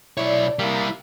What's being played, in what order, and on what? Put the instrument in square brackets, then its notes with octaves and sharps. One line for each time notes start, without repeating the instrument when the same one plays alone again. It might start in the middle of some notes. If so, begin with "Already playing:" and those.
[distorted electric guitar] B1 C#5 [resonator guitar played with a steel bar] A3 D5 [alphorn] E4
[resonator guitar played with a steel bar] C3 [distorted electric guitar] G3 E4 [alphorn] A#3